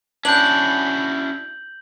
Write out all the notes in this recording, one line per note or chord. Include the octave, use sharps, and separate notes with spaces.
C#4 D4 E4 F#4 G6 F#7